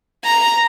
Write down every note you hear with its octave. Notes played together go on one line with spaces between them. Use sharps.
A#5